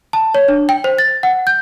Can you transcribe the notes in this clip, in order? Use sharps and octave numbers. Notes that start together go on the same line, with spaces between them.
A5
C#5
D4
G5
C5
A6
F#5
G6